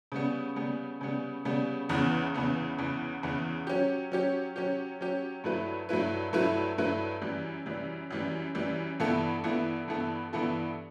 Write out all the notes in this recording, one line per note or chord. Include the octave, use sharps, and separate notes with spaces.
C#3 G3 B3
C#3 G3 B3
C#3 G3 B3
C#3 G3 B3
E2 C#3 E3 B3
E2 C#3 E3 B3
E2 C#3 E3 B3
E2 C#3 E3 B3
F#3 C#4 G4
F#3 C#4 G4
F#3 C#4 G4
F#3 C#4 G4
G2 F#3 A3 E4 B4
G2 F#3 A3 E4 B4
G2 F#3 A3 E4 B4
G2 F#3 A3 E4 B4
F#2 E3 G3
F#2 E3 G3
F#2 E3 G3
F#2 E3 G3
G2 E3 B3 E4 A4
G2 E3 B3 E4 A4
G2 E3 B3 E4 A4
G2 E3 B3 E4 A4